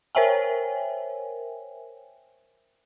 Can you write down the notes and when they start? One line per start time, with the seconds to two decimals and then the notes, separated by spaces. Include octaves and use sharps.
0.15 A#4 C5 C#5 E5 G5 G#5